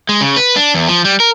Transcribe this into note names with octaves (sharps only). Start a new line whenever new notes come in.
G#3
C#3
B4
D4
E2
F3
G3
A#4